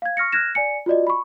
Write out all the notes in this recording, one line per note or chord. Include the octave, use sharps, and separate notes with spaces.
F5 G#6
C#6 F6 A#6 C#7
F6 F#6 G#6 A#6 E7
D5 G#5 C#7
F4 F#4 D5 D#5
B5 C#6